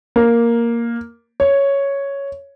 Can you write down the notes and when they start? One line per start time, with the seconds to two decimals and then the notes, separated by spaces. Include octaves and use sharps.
0.16 A#3
1.40 C#5